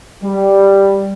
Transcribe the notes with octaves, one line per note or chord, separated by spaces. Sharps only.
G3